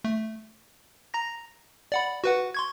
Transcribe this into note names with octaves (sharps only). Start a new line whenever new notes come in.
A3
A#5 A#6
D5 F#5 B5
F#4 B4 F#5
C6 C#6 G#6